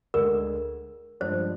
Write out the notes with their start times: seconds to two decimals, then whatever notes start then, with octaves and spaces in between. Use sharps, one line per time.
0.14 D2 D3 G#3 A#4
1.20 G2 F3 G#3 D4 C5